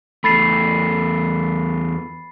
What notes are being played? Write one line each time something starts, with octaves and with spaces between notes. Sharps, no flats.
E2 A3 B5 A6 C7